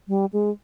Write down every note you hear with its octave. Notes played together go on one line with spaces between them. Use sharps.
G3
G#3